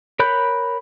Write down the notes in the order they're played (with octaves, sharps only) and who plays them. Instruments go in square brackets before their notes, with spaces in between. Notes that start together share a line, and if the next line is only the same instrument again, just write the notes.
[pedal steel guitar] A#4 C#5 B5 F#6 G6